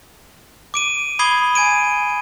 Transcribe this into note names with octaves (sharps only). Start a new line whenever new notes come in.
D6 D7 D#7
B5 D6 D#6 G#6 C7 G7
G#5 G#6 D7 D#7